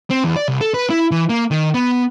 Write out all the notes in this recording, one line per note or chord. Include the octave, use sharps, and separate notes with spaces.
C4
E2
D5
C2
A4
B4
E4
E3
A#3
D#3
B3